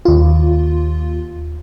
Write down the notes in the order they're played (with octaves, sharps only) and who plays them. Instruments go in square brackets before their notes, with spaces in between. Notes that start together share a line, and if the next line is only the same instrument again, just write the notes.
[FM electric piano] D#2 F4